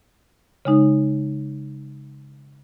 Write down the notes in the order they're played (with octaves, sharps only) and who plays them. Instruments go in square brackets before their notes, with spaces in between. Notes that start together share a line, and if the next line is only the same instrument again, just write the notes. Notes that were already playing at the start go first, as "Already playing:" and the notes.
[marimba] C#3 G#3 D#4